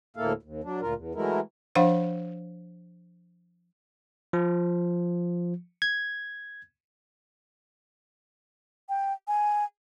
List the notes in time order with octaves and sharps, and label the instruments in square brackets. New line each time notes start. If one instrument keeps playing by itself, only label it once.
[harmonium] D2 A2 A#3 E4 A4 F5
D#2
F#3 D4
D2 A#2 F4 A#4
E2
E3 F#3 G#3 A3 E4 A#4
[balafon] F3 D4 C5 F5 F#5
[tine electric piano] F3
G#6
[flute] G5
G#5